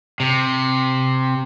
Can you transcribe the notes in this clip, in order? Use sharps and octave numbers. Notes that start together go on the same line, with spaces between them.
C3